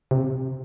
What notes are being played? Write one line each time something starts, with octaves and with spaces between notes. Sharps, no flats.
C3